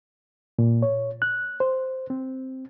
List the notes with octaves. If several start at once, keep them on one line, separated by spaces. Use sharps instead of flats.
A#2
C#5
F#6
C5
C4